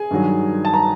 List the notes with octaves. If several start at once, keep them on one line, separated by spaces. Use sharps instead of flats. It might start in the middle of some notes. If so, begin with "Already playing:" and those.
Already playing: G#4 G#5
G2 D#3 F#3
A5
A#5